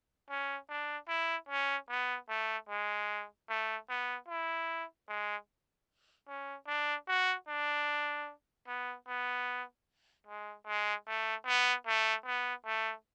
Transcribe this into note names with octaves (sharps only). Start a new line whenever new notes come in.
C#4
D4
E4
C#4
B3
A3
G#3
A3
B3
E4
G#3
C#4
D4
F#4
D4
B3
B3
G#3
G#3
A3
B3
A3
B3
A3